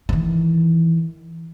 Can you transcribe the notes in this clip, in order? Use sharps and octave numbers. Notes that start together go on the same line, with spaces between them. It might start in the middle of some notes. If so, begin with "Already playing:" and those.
D#3 E3